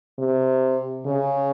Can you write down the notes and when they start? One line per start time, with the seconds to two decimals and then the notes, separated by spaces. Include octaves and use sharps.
0.19 C3
1.06 C#3